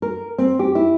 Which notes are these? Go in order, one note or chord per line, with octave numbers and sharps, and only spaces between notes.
A#4
C4
G4
E4